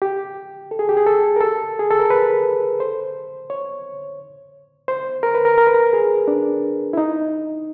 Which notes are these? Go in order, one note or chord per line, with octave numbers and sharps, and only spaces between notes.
G4
A4
G#4
G4
G#4
A4
A#4
A4
G#4
A4
A#4
B4
C5
C#5
C5
A#4
B4
A#4
A#4
B4
A#4
G#4
D4
E4
D#4